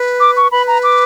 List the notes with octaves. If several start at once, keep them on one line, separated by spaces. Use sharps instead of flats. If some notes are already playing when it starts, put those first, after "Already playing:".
Already playing: B4
D6
C#6
B4 B5
A#5
D6